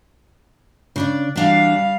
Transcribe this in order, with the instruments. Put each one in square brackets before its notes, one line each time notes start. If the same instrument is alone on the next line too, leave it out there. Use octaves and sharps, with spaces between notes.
[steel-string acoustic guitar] C#3 D4 D5
[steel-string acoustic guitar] E3 D4 F#4 [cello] G3 F5